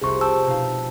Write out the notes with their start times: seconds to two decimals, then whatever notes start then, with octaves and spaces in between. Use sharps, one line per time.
0.01 F1 C2 G#4 C6 C#6
0.21 G5 A5 E6 G6 C#7
0.47 B2 D#4 F5